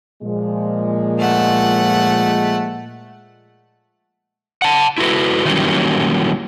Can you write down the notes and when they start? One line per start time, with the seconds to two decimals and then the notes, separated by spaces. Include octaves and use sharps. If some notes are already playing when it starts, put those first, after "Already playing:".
0.22 A#2 F3 G#3
1.19 A3 F#5
4.62 F#5 A5
4.98 E4 F#4 A4 B4
5.45 D#3 E3 F#3 G3 A#3 C#4